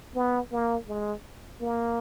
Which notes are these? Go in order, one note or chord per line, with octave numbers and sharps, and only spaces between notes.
B3
A#3
G#3
A#3